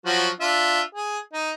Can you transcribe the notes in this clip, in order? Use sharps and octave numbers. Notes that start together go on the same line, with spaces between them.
F3 F#3 F#4
D4 F4 E5
G#4
D#4